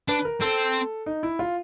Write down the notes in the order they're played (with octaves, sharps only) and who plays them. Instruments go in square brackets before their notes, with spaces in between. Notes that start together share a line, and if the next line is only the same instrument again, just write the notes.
[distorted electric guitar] D4 [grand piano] B4
[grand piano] A#4
[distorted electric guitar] C4 [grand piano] A4
[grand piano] D#4
E4
F4